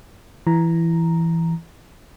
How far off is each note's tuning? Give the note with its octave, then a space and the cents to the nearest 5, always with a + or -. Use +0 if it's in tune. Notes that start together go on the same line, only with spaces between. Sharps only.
E3 +10 A#5 +0